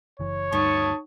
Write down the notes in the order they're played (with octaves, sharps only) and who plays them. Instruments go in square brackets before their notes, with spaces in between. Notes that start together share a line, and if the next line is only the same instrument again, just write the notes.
[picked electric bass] F#1 E3 [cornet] C#5
[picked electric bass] D2 G2 G3 [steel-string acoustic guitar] D#3 [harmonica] A5 C#6 D#6